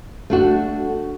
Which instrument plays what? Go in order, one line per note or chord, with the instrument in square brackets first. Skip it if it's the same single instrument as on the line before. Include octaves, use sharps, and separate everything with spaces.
[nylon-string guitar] A3 D4 F#4